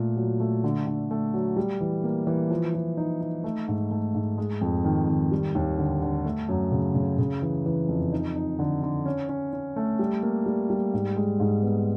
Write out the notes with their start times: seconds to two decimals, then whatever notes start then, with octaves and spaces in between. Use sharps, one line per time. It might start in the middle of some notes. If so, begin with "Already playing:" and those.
Already playing: A#2 A3
0.17 F#3
0.40 A3
0.64 D3
0.87 D3
1.11 A3
1.34 F#3
1.57 G3
1.81 E3
2.04 A#3
2.27 E3
2.51 F3
2.74 F3
2.97 D#4
3.21 D#4
3.44 A3
3.68 G#2
3.91 A3
4.15 G#2
4.38 G#3
4.61 F2
4.84 D#3
5.08 D#3
5.31 G3
5.55 D#2
5.78 D3
6.02 D3
6.25 A3
6.49 F#2
6.72 C#3
6.95 C#3
7.18 C#3
7.42 E3
7.66 E3
7.89 F2
8.12 D#4
8.36 D#4
8.59 D3
8.83 D3
9.06 C#4
9.29 C#4
9.53 C#4
9.76 A3
9.99 G3
10.23 A#3
10.46 G3
10.70 G3
10.94 G#2
11.17 G#3
11.40 G#2
11.63 B3